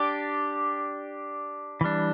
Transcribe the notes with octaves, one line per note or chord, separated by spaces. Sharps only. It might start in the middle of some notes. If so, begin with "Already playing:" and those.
Already playing: D4 G4 D5
E3 G3 D4